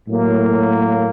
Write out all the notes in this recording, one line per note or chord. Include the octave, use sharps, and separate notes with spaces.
A2 F#3 A#3